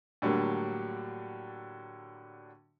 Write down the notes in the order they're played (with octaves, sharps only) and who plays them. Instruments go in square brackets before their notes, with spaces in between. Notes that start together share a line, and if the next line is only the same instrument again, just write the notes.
[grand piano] A2 D3 F#3 G3 A#3